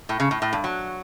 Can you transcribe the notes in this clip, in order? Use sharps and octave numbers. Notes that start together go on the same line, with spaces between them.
A2
C#3
A2
A2
G2
F#3